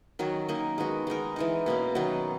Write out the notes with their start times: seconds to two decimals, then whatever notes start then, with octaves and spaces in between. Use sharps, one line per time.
0.19 D#3 F#3 C#4 F#4
0.48 D#3 A#3 D#4 A#4
0.78 G#3 B3 F#4
1.07 G#3 D#4 A#4
1.36 E3 G#3 D#4
1.66 B2 A#3 C#4
1.95 D#3 F#3 B3 D#4